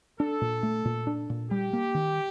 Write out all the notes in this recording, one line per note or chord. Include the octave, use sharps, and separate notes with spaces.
D4 A4
A#2
A3
A#2
D4
A#2
G3 G4
A#3
D#3